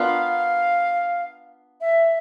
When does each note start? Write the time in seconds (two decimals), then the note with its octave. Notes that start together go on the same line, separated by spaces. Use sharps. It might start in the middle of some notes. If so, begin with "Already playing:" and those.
Already playing: B3 D4 F4 A#4 F5
1.81 E5